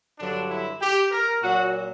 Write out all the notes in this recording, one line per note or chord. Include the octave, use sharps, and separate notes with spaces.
G2 D3 F#3 D4
E4
G4
A#4
A#2 F#3 F#4